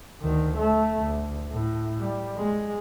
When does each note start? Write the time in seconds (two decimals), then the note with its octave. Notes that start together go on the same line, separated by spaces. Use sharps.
0.22 D2 D#3
0.57 A3
0.98 D2
1.51 A2
1.99 G3
2.37 G#3